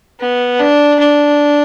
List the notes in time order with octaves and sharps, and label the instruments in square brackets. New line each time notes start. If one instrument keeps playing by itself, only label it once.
[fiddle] B3
D4
D4